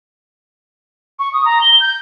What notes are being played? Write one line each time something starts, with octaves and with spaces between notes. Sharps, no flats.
C#6
D#6
A#5
G7
G6